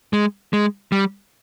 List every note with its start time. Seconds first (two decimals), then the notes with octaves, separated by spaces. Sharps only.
0.13 G#3
0.53 G#3
0.92 G3